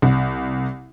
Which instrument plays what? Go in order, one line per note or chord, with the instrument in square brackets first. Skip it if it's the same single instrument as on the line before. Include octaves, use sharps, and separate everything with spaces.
[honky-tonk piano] C2